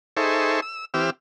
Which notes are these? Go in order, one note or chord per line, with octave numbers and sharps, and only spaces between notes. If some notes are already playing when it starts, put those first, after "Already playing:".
D#4 G#4 A4 C5 E5 C#6
E6
E3 C4 G4 D6 E6 F6